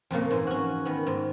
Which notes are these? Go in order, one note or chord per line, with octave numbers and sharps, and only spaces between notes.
F2 A#2 C#3 A#3
G#2 E3
C#4 F#4
D#3 B3
G#2